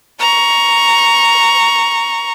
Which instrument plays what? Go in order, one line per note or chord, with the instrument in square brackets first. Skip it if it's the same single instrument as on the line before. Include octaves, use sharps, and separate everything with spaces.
[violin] A#5 C#6